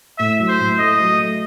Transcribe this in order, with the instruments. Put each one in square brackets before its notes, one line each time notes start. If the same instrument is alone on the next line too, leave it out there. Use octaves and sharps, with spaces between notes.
[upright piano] A2 [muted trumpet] E5
[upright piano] F#3
[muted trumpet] C5
[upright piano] A2
[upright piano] A3 [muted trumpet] D#5
[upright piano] F#3
A3